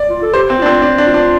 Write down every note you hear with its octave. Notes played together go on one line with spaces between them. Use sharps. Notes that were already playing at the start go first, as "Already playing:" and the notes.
Already playing: D5
F4
A4
G4 C5
C4
D4 F4
C4
D4
D4
F4
D4